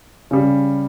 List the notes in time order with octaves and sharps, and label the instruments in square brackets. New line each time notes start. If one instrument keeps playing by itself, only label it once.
[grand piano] C#3 G3